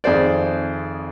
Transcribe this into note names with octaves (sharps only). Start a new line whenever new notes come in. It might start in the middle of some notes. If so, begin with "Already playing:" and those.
G#1 F2 G#4 C5 D5